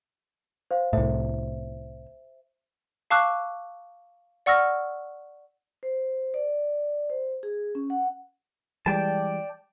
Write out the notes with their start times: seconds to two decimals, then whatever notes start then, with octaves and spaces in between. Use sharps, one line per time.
0.71 C5 F5
0.93 C2 A2 C5 E5
3.11 F5 A5 C#6 D6 E6 F#6
4.46 D5 F#5 C#6 E6 F6 A#6
5.83 C5
6.34 D5
7.10 C5
7.43 G#4
7.75 C#4
7.90 F#5
8.86 E3 G3 G#3 D5 G5 A5